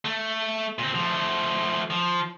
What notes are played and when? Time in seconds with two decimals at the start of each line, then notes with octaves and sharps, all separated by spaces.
0.05 A3
0.79 A#2 C4
0.95 F3 A3
1.90 F3